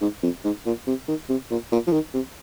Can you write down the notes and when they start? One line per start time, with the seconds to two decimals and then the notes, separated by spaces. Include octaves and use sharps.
0.01 G#2
0.23 F2
0.44 G#2
0.66 A#2
0.87 C3
1.08 D#3
1.29 C3
1.51 A#2
1.72 A#2
1.87 F3
1.92 D#3
2.14 C3